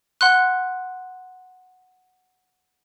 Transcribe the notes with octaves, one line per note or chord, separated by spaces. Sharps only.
F#5 C6 F#6